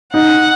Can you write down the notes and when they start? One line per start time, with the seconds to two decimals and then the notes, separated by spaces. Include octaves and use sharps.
0.13 D#4 F#5